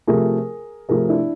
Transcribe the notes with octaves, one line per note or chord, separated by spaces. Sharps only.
C3 F3 A3 G#4 A#4
C3 F3 A3 G#4 A#4
D4 E4